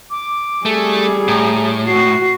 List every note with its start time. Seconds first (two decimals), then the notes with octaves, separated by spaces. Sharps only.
0.10 D6
0.66 G3 A3 G#4
1.28 A2 A#5
1.88 F#4 C7